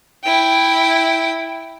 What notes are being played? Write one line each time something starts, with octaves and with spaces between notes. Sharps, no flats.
E4 G5